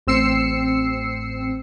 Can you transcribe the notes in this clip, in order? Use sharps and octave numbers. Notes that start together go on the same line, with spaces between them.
A1 C4 E6 C7 C#7